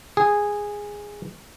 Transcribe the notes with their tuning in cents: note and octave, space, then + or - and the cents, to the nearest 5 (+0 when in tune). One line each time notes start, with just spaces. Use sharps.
G#4 -10